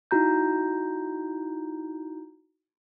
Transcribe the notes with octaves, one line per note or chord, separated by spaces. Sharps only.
D#4 E4 F#4 A#5 G6